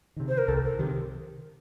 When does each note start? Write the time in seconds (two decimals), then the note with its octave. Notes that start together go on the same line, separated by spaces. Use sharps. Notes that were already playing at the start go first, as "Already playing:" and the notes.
0.17 C3 D#3
0.28 C5
0.38 A#4
0.48 C2 A4
0.63 A#4
0.79 C3 D#3 G4